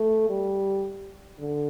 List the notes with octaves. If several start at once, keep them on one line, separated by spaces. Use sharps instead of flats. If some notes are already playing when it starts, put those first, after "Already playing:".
Already playing: A3
G3
D3